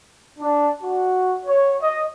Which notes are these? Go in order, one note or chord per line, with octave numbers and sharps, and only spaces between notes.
D4
F#4
C#5
D#5